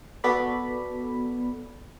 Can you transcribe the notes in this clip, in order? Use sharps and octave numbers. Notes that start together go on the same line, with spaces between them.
B3 F#4 A4 D5 B5